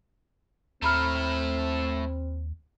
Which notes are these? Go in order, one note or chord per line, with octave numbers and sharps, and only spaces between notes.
D#2 A3 C4 E4 A#5 B5 F6